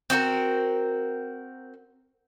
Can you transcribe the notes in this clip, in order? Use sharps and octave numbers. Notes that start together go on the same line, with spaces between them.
C4 F#4 A4 A#4